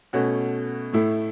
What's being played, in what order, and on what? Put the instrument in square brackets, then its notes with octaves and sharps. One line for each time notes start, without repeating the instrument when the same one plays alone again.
[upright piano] B2 A3 C#4 F#4
A2 A3 E4